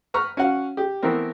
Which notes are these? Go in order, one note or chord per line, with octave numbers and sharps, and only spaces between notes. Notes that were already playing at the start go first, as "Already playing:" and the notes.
B4 A#5 C#6 F6
C#4 F#4 F5 F#5
G4
E3 A3 B3 C4 A#4